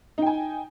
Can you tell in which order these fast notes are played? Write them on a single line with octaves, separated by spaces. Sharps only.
D#4 G5 G#5